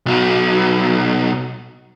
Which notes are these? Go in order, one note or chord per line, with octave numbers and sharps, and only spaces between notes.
B1 F#3